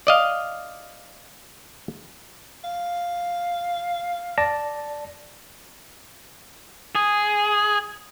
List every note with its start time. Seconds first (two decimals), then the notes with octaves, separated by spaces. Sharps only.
0.07 D5 D#5 F5
2.64 F5
4.38 D5 A5 A#6
6.95 G#4